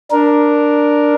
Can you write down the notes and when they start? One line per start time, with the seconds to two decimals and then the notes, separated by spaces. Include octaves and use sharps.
0.12 D4 A#4